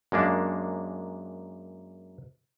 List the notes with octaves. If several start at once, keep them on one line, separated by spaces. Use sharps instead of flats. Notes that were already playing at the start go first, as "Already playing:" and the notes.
F#2 G#3 A#3 D4